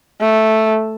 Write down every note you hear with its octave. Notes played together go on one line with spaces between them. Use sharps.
A3